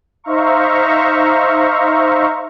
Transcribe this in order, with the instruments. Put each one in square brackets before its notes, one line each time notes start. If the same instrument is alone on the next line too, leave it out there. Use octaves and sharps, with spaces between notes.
[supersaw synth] D#4 C5 E5 F5 A#5 C#6